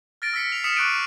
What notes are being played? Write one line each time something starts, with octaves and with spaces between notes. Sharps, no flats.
F6 A6 A#6 D7
E6 A#6 B6 C#7
C7 F7
D#6 F6 B6 C#7 E7
C#6 D6 F#6 B6 D7 D#7
C#6 C7